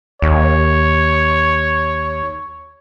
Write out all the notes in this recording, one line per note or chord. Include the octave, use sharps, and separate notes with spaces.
D#2 C#5